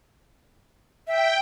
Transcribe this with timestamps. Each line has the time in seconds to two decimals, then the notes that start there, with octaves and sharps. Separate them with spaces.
1.07 E5 G5